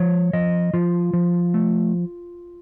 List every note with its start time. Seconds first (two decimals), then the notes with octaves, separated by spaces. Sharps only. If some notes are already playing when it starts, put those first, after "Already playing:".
Already playing: F3 C#5
0.33 F3 D#5
0.73 F3 F4
1.13 F3
1.54 A3